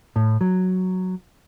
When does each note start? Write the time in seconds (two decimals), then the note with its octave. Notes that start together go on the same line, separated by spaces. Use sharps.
0.16 A2
0.41 F#3